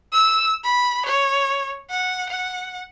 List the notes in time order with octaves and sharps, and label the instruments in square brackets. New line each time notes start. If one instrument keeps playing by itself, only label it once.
[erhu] E6
B5
C#5
F#5
F#5